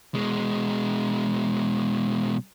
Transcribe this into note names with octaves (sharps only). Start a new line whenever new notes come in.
B2 G#3